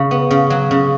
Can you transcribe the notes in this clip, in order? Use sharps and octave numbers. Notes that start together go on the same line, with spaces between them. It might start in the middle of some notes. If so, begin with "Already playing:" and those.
Already playing: C#3 B5
B3
C#3
F#3
C#3